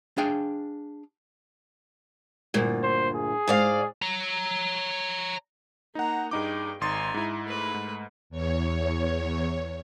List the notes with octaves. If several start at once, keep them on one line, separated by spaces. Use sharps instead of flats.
D4 G#4 F5 G5
D2 G2 A#2
C5
G#4
G#2 D5 F5
C#5 A#5
A#3 D#4 F#5 A#5
G2 D#4 G#4 G5 D6
G#1 D#4 G#5 C6 A6
G#2 E4
A3 B4
G#2
E2 C#5